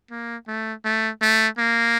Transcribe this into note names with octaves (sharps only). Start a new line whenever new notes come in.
A#3
A3
A3
A3
A#3